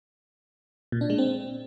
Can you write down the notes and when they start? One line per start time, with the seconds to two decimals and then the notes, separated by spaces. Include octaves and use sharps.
0.92 A#2
1.01 D4
1.10 G#3
1.18 C4